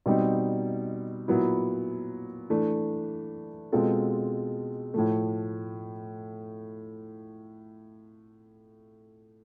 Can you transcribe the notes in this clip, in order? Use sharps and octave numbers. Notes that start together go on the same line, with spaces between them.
B2 G3 C4 D#4
A#2 F#3 B3 E4
E3 A3 D4
B2 G#3 C4 F4 A4
A2 F3 A3